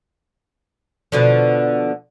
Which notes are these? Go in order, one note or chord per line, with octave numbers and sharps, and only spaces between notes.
B2 D3 F3